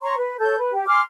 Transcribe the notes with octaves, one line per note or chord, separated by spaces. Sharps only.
C#5 A#5 C6 C#6
B4
A4 C#5 G6
B4
G4
G#5 C6 D6 F6